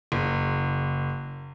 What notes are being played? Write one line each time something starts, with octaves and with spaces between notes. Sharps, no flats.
F#1